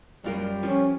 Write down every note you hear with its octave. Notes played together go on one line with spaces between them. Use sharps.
F#2 G3 F4 A#4
F3 C#4